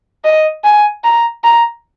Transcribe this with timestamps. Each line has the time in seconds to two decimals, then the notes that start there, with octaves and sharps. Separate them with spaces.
0.25 D#5
0.64 G#5
1.04 A#5
1.44 A#5